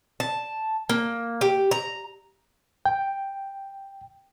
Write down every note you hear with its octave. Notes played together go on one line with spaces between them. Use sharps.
A5
A#3
G4
A#5
G5